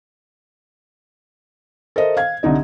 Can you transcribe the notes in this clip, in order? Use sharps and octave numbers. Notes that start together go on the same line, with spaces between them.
A4 A#4 C5 D#5 E5
F5 G#6
C2 D3 D#4 D#5